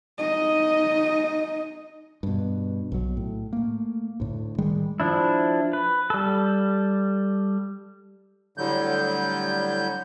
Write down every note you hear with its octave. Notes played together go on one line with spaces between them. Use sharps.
D#4 D#5
G2 B2
B1 F#3
A2
A3 A#3
D2 A2
D#3 G3 G#3
F3 D4 E4
B4
G3 A4
A2 D3 F#3 G3 G6